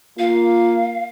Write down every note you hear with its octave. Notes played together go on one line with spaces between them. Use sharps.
A#3 F4 F5